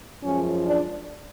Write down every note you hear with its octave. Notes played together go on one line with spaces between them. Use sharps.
F#2 F3 G#3 C#4
D4